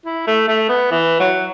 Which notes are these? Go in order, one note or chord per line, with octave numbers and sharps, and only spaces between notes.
E4
A3
A3
B3
E3
F#3